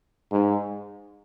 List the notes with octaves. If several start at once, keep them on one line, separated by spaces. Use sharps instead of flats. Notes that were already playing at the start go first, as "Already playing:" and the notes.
G#2